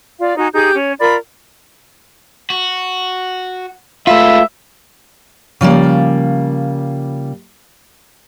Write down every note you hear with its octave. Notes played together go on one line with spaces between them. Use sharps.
F4 D5 F5
D#4 F#4 G#5
D#4 G4 G#4 G6
C#4 C#5
F4 A#4 D5 B5
F#4
G#3 A3 F4 B4 E5
C#3 F3 G3 A#3